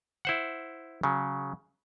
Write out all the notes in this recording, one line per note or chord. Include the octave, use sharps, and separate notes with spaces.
E4 C5 F#5
C#3 F#3